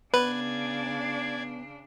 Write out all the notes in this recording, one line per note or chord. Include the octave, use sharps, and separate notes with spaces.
C#3 B3 D4 B4 D5 G#6